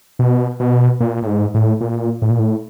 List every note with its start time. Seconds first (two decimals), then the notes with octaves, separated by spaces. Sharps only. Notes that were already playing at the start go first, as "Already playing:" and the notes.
0.19 B2
0.60 B2
1.00 A#2
1.23 A2
1.27 G#2
1.54 A2
1.81 A#2
2.22 A2
2.30 A#2
2.39 A2